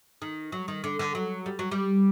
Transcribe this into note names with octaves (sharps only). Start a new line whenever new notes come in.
D#3
F#3
D#3
D3
D3
F#3
G3
F#3
G3